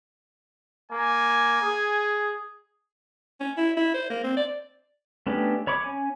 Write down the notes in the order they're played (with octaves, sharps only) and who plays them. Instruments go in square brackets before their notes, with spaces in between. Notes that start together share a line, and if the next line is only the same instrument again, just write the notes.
[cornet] A#3 [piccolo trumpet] G#5
[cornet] G#4
[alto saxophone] C#4
E4
E4
C5
A#3
C4
D5
[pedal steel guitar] A3 B3 C#4 D4 G4
C#5 B5 C#6 D6
C#4 G#5